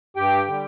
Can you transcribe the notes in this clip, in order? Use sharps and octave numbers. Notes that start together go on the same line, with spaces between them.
G2 G4 G5
D3 G3